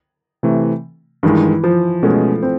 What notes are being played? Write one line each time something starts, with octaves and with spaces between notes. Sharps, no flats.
C3 E3 A3
G2 D#3 E3 G#3
F3
B2 G#3 A3 C#4
C4